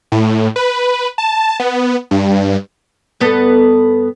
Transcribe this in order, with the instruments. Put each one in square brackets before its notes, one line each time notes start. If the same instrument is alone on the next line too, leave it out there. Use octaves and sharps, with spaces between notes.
[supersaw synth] A2
B4
A5
B3
G2
[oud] G2 B3 A4